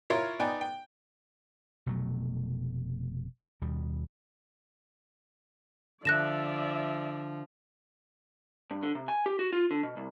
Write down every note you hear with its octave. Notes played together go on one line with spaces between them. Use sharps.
E4 F4 A#4 C#5 F5 C6
B3 D#4 D5 G5 G#5
G5
F1 B2 F#3 A3
D#2 B2 G3
D3 F3 D5 E5 F#6 A#6 E7
G2
D3
C3
G#5
G4
F#4
F4
D3
B2
C2